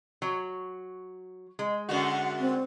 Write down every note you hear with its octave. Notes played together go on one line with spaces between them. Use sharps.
F#3
G#3
F#2 D3 F#4
C4